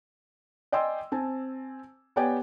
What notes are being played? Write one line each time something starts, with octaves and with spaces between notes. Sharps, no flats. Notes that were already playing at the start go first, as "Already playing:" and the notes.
D5 D#5 G5 G#5 C6 E6
C4 G#5 A5
B3 G4 C#5 D5 G5 G#5